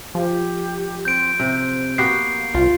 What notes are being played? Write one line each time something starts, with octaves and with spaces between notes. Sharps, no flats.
F3 G4
C4 G6 D7
C3 C5
A#3 B3 F#4 G4 C7
C2 F4